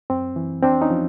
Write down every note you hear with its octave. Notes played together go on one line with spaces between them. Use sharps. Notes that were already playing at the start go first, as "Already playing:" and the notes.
F#2 C4
E3
F2 C4 D4
C#4 D#4
F3